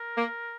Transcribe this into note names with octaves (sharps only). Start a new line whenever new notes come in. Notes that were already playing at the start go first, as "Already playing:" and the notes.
Already playing: A#4
A#3